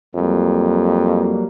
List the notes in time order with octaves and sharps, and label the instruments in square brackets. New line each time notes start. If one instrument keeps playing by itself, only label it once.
[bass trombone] F2 [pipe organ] F#3 G3 A#3